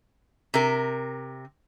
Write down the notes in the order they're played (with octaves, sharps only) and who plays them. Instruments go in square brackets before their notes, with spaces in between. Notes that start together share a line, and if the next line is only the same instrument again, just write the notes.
[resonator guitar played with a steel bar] C3 A#4